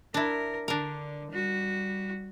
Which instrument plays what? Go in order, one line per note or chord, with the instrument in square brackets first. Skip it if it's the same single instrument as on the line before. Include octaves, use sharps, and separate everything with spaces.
[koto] D4 E4 [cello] A#4
[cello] D3 [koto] D4 A#4
[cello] G3 F#4